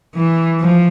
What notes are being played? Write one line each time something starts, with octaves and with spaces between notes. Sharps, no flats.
E3
F3